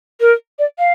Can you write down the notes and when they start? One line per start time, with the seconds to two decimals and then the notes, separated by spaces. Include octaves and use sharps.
0.21 A#4
0.59 D5
0.79 F5